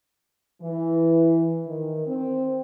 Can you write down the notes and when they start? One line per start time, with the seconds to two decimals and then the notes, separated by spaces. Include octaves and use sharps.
0.62 E3
1.67 D#3
2.07 C4